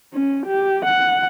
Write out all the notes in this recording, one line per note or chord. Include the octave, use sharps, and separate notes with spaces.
C#4
G4
F#5